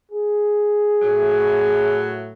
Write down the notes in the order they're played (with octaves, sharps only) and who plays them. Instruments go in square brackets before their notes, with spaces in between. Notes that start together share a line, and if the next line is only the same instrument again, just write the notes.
[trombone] G#4
[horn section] A2 F#3